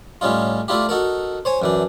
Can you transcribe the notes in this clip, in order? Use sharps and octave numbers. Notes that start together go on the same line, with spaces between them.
A2 G3 C#4 D#4 F4
A3 D4 E4 F4 G4
D#4 F#4 A4 A#4
C5 C#5 G#5
F#2 E3 D4